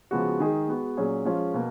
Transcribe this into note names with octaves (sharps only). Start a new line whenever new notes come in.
C#3 F3 G#3 B3 F#4
D#3 G#3 D#4 G#4
G#3 B3 F#4
A#2 F#3 C#4 G#4
F3 G#3 C#4 F4
B2 A#3